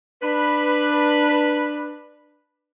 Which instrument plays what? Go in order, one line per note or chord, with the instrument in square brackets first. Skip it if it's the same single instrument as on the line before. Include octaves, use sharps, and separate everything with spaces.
[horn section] D4 B4